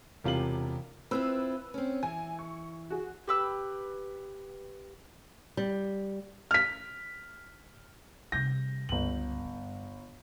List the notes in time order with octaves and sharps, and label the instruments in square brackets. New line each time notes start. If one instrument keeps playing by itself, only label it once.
[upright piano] E1 C3 F4 G4 F#7
[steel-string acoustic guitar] C4 E4 F4 [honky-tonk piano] B4 E6
[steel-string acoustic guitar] C4 C#4
[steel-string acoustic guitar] E3 [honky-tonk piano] G#5
[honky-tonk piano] C#6
F#4 G#4
[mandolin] G4 B4 E6
[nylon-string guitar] G3
[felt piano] F6 B6
[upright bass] C3 G3 [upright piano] G6 A#6
[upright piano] G1 F#7 [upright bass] C#2 G2
[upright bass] G2